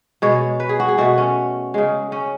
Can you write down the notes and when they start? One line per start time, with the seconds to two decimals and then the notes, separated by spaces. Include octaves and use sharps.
0.22 B2 G#3 C#5
0.60 B4
0.69 G#4
0.80 F#4
0.89 G#4
0.98 B2 A3 F#4
1.18 C#4
1.74 C#3 G#3
2.12 C#4